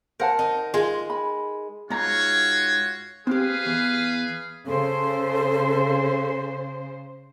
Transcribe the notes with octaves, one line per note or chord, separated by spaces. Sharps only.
A#4 C5 F#5 A5
D#4
G#3 F4
B5
G#2 F4 F#4 C#5 A#5
C4 G4 G#4 B4 F5
E2
C#3 A4 C5